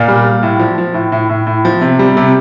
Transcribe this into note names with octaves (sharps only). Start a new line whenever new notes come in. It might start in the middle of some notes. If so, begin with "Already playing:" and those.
Already playing: A#2 D5 F5
G3
G3
A2
F3
F3
A2
A2
A2
A2
F3
C3
G3
C3